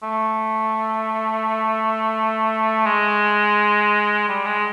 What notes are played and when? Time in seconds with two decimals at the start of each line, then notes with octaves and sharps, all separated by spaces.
0.03 A3
2.86 G#3
4.28 G3
4.46 G#3